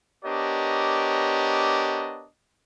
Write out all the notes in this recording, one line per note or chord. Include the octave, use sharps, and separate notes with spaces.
B3 D4 G4 A#4 C#5 D#5